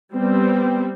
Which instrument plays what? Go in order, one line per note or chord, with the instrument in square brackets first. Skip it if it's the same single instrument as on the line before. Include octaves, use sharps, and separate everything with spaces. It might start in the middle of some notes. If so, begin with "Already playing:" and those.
[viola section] G3 C4 [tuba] B3